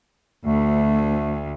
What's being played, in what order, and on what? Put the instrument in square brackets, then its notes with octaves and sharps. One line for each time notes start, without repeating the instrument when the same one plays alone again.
[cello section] D2 [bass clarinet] A3